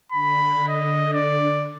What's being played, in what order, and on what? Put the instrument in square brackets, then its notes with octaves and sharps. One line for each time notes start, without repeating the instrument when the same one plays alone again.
[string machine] D3 [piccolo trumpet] B5
[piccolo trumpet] D#5
D5